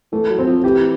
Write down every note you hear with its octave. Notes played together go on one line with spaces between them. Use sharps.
E3 A3
F#3
C4
F3
E3 G4